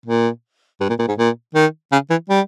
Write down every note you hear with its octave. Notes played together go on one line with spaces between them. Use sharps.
A#2
G2
A#2
A#2
G#2
A#2
D#3
C#3
E3
G3